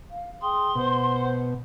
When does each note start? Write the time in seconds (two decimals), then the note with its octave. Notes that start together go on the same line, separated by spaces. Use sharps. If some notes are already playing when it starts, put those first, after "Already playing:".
0.09 F5
0.41 G#4 G5 C6 D#6
0.75 B2 C5 F#5